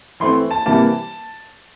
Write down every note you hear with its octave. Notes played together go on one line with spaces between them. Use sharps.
E3 A3 C4 C6
A5
C3 E3 G3 A#3 A5